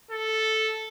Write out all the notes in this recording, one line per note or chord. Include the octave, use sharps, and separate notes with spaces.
A4